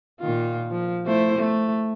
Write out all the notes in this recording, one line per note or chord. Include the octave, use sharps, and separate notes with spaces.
A#2 D#3 F4
F3
A3 E4 C5
A3